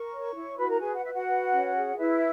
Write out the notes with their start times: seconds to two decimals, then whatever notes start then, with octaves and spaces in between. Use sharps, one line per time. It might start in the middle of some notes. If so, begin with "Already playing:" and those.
Already playing: A#4 C#6
0.11 C#5
0.34 E4
0.58 F#4 B4 B5
0.70 A#4 A#5
0.81 G#4 B4 G#5
0.93 F#5
1.03 F#4 E5
1.13 F#4 F#5
1.27 B4
1.51 C#4
1.75 G#4
1.97 E4 B4 E5